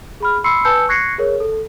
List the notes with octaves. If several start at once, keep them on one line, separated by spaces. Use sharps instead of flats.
G#4 B5 F6
B5 C6 E6 C7 C#7
B4 G#5 A5 E6 G6 C#7
C#6 F#6 G#6 A#6 C7 C#7
G#4 A#4 C#5
A4